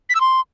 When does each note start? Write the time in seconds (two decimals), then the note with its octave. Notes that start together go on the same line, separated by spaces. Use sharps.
0.09 B6
0.15 E6
0.21 C6